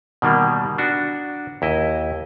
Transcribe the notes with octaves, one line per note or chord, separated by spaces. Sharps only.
B2 D#3 G3 A#3
D4 F#4
D#2 E4 D#5